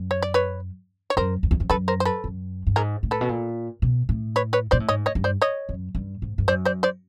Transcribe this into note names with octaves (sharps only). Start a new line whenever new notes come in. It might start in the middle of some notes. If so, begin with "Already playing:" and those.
Already playing: F#2
C#5
D5
B4 C#5
C#5
F#2 A#4 C5
F2
E2
F2
F#2 A4 B4
A#4 C5
C5
A4 B4
F#2
G2
G#2 G#4 A#4
A2
A4 B4
B2
A#2
B2
A2
B4 C#5
B4 C#5
A#2 C5 D5
A2
G#2 C#5 D#5
C#5 D#5
G2
C5 D5
C#5 D#5
F#2
G2
G#2
G2
F#2 C5 D5
C5 D5
C5 D5